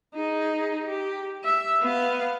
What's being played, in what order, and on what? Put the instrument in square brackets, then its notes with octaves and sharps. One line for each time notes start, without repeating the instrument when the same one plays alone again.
[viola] D#4 G#4
G4
E5
B3 F5